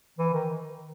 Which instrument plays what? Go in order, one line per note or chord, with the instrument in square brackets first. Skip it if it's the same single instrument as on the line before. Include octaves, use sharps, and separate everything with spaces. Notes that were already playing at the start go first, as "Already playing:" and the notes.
[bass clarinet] E3
D#3